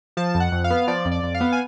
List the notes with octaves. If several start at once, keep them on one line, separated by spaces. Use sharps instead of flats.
F3 A5
F2
F#5
F2
F5
B3
F3 D5
F2
D5
F2
F5
B3
G#5